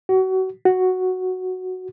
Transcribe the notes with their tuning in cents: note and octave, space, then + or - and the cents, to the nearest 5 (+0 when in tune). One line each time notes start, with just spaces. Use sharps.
F#4 +30
F#4 +0